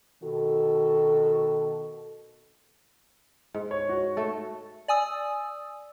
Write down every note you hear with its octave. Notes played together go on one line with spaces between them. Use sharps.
B2 D#3 F#4 A4
G#2
C#5
F#4 C#5
A3 A4
D5 G#5 D#6 E6